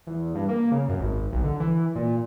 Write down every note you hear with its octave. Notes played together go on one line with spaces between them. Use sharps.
E2
G2
A#3
C#3
F#2
G#1
B1
D3
E3
A#2